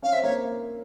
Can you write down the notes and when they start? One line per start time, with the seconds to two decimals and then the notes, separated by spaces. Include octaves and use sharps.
0.02 C#4 C#5 F5
0.12 C4 C5 E5
0.23 A#3 A#4 C#5